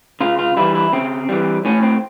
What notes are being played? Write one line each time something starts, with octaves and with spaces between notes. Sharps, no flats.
C#3 F4
F4
E3 G3 E4
E4
C#3 C4
E3 G3
A2 C#4
C4